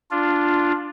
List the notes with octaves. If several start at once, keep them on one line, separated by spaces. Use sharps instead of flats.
D4 F4